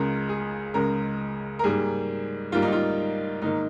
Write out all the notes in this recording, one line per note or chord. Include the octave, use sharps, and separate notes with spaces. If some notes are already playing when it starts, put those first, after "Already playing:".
Already playing: C#2 C#3 G#3 A#4
G#4
C#2 C#3 G#3 A#4
A#4
G#2 G3 A#3 G#4
G#2 G3 A#3 F4
D#4
F4
G#2 D#3 A#3 D#4